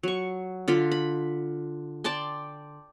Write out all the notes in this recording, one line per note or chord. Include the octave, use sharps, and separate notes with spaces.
F#3 C#6
D3 F4 B5
B5
D5 G5 A5 C6